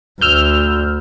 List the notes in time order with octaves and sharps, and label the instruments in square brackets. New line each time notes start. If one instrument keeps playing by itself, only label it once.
[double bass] D2 [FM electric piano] E6 F6 G6